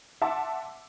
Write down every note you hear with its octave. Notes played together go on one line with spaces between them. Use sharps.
E5 F#5 A5 C6 D6 E6